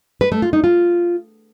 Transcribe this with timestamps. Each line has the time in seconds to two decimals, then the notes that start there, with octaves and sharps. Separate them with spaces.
0.21 B4
0.32 A3
0.42 F4
0.53 D#4
0.64 F4